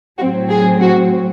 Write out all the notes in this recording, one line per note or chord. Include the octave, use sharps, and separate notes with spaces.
A2 F#3 C4 F#4
G#4
F#4